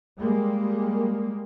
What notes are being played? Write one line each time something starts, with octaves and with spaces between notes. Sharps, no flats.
G3 G#3 A#3